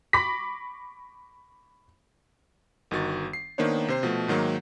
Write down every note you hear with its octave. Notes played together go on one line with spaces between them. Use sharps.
B5 C#6 D6 A#6 B6
G1 D#3 F#4 A6
C7
D#3 A#3 B3 D4 C5 C#5
C3 C5 C7
B2 F3 A3
G#2 D#3 F#3 A#3